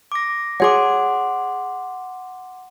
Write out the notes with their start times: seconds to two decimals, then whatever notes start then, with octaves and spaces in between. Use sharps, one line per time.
0.12 D6 A#6
0.60 G#4 C#5 F#5 C6 D6